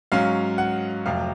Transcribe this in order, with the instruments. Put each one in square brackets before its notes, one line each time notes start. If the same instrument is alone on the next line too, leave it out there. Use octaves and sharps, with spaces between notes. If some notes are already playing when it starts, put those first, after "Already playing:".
[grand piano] G#2 F#3 C#4 F5
F#5
F1 F2 C3 F#3 F5